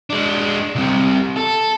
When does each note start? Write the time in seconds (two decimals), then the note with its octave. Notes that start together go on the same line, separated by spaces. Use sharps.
0.10 G#3 D4
0.75 C2 C3
1.36 A4